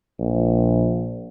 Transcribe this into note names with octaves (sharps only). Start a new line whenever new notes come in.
A#1